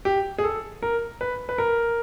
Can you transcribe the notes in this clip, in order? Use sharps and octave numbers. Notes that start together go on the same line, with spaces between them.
G4
G#4
A4
A#4
B4
B4
A#4